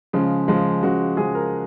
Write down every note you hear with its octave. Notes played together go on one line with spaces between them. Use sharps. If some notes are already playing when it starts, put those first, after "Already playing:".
C#3 F3 G#3
C#3 F3 G#3
C#3 F3 G#3 F#4
C#3 F3 G#3 G#4
A#4